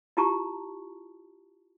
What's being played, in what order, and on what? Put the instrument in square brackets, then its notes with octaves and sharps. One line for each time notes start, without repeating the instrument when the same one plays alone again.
[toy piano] E4 F4 G4 A5 A#5 C#6